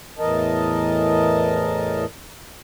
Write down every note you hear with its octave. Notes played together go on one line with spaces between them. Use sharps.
E2 A2 E3 A#4 D#5 A5